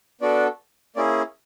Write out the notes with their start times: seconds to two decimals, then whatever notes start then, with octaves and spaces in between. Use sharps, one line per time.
0.21 B3 D4 F#4 A4 D5
0.96 A#3 C#4 E4 G#4 D5